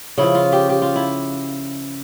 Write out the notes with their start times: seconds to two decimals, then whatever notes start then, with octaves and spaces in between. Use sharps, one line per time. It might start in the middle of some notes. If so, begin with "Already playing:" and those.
0.18 C#3 F3 E4
0.35 F4
0.52 G4
0.70 G4
0.82 F4
0.96 E4